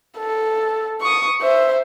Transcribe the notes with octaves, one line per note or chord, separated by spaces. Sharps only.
A4
C#6 D#6
C5 E5